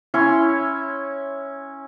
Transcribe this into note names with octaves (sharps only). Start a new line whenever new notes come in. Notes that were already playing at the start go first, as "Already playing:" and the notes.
C#4 E4 C#5 C6